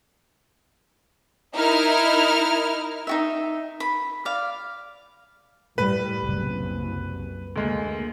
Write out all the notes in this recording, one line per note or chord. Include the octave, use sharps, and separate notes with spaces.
D#4 E4 A#4 F6
D#4 F#4 E5
B5
D5 F5
A2 G3 B4
F#1 C2
D2 G#3 A#3